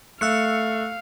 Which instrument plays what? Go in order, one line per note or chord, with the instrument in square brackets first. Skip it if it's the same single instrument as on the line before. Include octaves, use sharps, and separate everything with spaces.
[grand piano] A3 [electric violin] F5 [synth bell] E6 F#6 C#7